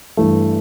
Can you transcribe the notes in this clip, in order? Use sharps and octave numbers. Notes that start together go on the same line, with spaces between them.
G2 E3 A3